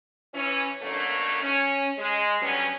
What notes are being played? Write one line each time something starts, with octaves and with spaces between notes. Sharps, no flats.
E3 C#4
F#2 B2 D3 A3 A#3 C#5
C#4
G#3
D3 F#3 G3 B3 C#4